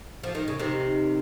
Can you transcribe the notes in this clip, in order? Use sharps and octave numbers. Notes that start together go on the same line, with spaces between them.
F3
D#3
C#3
C3 D#3